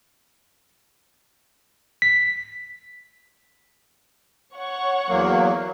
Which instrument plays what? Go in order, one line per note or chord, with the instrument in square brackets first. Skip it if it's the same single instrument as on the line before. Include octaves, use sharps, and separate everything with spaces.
[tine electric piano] B6
[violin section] C#5 F#5 C#6
[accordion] E2 F#3 A#3